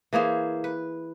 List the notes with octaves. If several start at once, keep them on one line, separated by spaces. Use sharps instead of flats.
E3 A#3 G#4 C5
B4